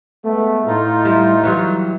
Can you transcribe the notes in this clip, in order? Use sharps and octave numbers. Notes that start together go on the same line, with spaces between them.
G#3 A3 B3
A2 D#4 F4
G3 E4
E3 F#3 G3